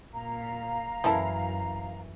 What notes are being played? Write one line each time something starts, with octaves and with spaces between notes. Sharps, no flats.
A#2 F5 A#5
F#2 E3 A3 C#4 E4 A#4 A5